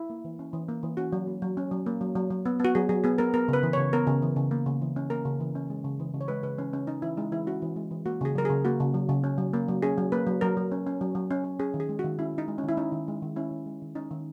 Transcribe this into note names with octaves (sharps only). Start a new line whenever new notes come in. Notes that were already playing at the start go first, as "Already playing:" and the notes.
Already playing: E4
A#3
E3
C#4
E3
A#3
E3
C#4 F#4
F#3
A#3
F#3
C#4
F#3
A#3
F#3
F#3
F#3
B3
B3 F#4
F#3 G#4
F#3 G#4
B3 G#4
B3 A#4
B3 A#4
C#3
B4
E3
C#3 C#5
B3 A#4
C#3
E3
C#3
A#3
C#3
E3
C#4
A#3 A#4
C#3
E3
C#4
G#3
C#3
E3
C#3
C#5
G#3 B4
C#3 B4
E3 C#4
C#3 C#4
C#4 D#4
E3 E4
G#3 D#4
E3 E4
C#4 F#4
E3
G#3
E3
A#3 F#4
C#3 G#4
F#3 A#4
C#3 G#4
A#3 F#4
C#3
F#3
C#3
C#4
F#3
A#3
F#3
C#4 G#4
F#3
A#3 B4
F#3
F#3 A#4
F#3
C#4
C#4
F#3
F#3
C#4
C#4
C#4 G#4
D#3
G#4
G#3
F#4
D#3
C#4 E4
D#3 D#4
G#3
C#4
D#3
E4
C#4 D#4
D#3
G#3
D#3
C#4 E4
D#3
G#3
D#3
C#4 D#4
D#3